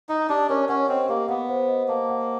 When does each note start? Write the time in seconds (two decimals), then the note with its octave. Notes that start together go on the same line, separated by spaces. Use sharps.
0.09 D#4 D#5
0.29 D4 G4
0.49 C#4 A#4
0.69 C#4 F#5
0.88 C4 D#5
1.09 A#3 G4
1.28 B3 F#5
1.49 C5
1.68 D#5
1.88 A#3 A5
2.09 F#5